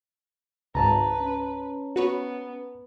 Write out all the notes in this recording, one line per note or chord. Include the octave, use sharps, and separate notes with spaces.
G#1 C#2 G#2 B4 A5 A#5
C#4
B3 F#4 B4 C#5